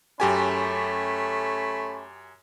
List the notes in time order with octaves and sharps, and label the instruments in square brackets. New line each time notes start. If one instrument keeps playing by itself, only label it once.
[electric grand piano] F#2 G4 G#5 [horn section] A3 C#4 B5